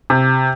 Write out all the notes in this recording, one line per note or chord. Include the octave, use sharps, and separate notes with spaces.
C3